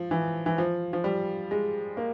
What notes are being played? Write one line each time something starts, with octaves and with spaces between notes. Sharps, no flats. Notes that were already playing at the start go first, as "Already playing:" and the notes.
Already playing: F3
E3
E3
F3
F3
G3
G#3
A#3